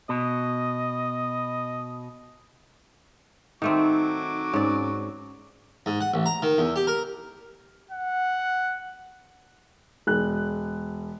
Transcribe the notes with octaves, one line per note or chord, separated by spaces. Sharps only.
B2 D#5
D#3 F#3 A3 C4 D#4 D6
G#2 C#4 D5
G#2
F#5
A1
A#5
D#3
E2
G4
A#4
F#5
E1 F#6